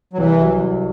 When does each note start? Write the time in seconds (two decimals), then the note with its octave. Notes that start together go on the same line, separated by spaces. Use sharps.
0.13 F#3
0.18 C2 E3
0.40 F#3
0.60 C2